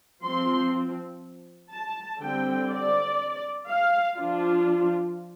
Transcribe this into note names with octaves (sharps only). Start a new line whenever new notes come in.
F3 C4 C6
A5
D3 G3 C4 G5
D5
F5
F3 D4 F4